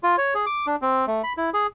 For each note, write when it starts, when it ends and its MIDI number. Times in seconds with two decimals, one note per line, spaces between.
0.03 0.16 65
0.18 0.34 73
0.35 0.46 68
0.46 0.66 86
0.67 0.76 62
0.82 1.05 60
1.07 1.22 57
1.23 1.33 83
1.37 1.50 64
1.54 1.67 68